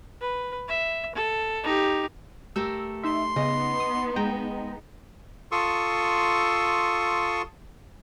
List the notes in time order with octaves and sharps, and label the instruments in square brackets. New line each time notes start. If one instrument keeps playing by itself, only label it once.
[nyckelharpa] B4
E5
A4
D#4 G4
[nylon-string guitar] A3 G4 A#4 [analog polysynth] E6
[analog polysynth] D#4 E5 [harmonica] C6
[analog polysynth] C#3 [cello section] B3 D#4 [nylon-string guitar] D#5
[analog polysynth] D#6
[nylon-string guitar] G#3 [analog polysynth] G5 A#5
[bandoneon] F4 A4 C6 C#6 D#6 E6